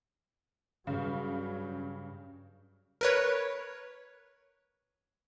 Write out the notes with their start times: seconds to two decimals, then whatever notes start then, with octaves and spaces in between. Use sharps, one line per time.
0.87 G2 C#3 F#3
3.01 A#4 B4 C#5